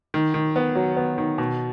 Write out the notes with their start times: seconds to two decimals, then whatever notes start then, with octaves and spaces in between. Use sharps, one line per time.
0.14 D#3
0.34 D#3
0.56 B3
0.75 F#3
0.97 B3
1.18 D#3
1.38 B2